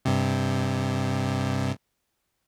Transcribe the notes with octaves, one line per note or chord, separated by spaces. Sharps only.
G2 C3